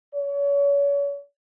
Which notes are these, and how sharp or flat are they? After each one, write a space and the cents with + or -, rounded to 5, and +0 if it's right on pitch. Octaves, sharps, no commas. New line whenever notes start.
C#5 +35